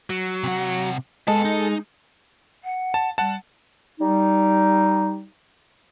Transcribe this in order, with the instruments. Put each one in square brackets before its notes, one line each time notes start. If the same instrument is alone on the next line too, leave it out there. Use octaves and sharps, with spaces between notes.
[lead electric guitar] F#3
[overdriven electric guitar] C3 F#5
[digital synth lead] G#3 [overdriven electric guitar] B3 A5 [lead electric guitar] A4
[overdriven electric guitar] D#4
[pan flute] F#5
[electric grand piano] A5
[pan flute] G3 [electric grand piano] F#5 A5
[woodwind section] G3 D#4